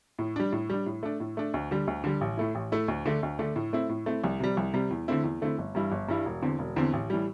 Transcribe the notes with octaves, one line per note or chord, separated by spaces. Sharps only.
A2
G3 D4
A2
G3 D4
A2
A3 D4
A2
A3 D4
D2
D3 G3
D2
D3 G3
A1
A2 A3 E4
A1
A2 A3 E4
D2
D3 A3 D4
D2
D3 A3 D4
A2
A3 C4 E4
A2
A3 C4 E4
C2
C3 G3
C2
C3 G3
E2
D3 A3 C4 E4
E2
D3 A3 C4 E4
G1
G2 E3 G3 E4
G1
G2 E3 G3 E4
E1
E2 D3 C4
E1
E2 D3 C4
A1
A2 E3 G3